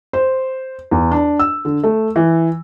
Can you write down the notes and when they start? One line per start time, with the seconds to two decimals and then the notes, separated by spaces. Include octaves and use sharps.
0.13 C5
0.91 E2
1.11 D4
1.39 E6
1.65 D3
1.84 A3
2.16 E3